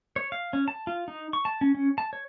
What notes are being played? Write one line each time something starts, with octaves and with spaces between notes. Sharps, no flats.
C#5
F5
C#4
A5
F4
D#4
C#6
A5
C#4
C#4
A5
C#5